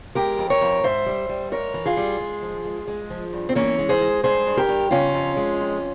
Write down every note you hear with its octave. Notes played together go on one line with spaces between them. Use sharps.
G#3 G4 A#4
F2
A#4 C#5
F2
G#2 C5 E5
G3
G3
G#2 A#4 C#5
E3
F4 G#4
G3
G#3
F3
G#3
G#3
F3
G2
C4
E3 A#3 C#4
G#3
G#4 C5
G#3
G2 G#4 C5
G2
G4 A#4
G2
C#3 C#4 F4
F2
G#3
F2